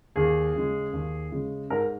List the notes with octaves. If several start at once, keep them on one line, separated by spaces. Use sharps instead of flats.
D#2 G#4
C#3 G#3
D#2
C#3 G#3
G#2 A#4